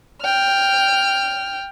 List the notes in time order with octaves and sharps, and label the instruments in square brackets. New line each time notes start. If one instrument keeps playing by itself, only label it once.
[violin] G5 F6